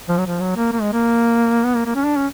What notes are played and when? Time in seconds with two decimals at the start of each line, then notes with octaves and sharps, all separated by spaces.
0.09 F3
0.18 F#3
0.26 F3
0.40 F#3
0.56 A#3
0.72 A#3
0.81 G#3
0.93 A#3
1.64 B3
1.75 A#3
1.86 A#3
1.95 C#4
2.05 D4
2.16 C#4